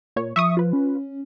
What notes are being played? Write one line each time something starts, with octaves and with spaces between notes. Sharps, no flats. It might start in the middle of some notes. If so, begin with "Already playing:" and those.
A#2 C#5
F3 E5 C#6 D#6
F4 B4
C#4